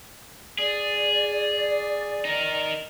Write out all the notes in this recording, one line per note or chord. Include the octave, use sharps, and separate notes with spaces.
G#4 D5
D#4 A#4